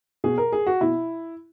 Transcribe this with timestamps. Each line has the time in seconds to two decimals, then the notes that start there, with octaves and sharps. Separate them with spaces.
0.24 B2 G#4
0.38 A#4
0.52 G#4
0.67 F#4
0.81 B2 E4